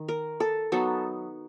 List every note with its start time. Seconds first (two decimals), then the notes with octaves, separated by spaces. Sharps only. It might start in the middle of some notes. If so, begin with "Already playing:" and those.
Already playing: D#3
0.09 A#4
0.40 A4
0.72 F#3 B3 D#4 A4